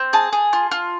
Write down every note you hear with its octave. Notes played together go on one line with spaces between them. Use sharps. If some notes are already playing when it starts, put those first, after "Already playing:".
Already playing: C4
G#4 A5
G#4
F4
F4